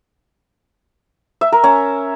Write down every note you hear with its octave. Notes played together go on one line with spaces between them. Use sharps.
E5
A#4
C#4